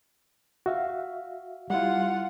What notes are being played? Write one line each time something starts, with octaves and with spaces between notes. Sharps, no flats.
F#4 E5 F5
G3 E4 F4 F#5